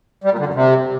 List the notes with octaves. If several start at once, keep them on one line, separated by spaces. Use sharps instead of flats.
G3
A#2
D3
F#2
C3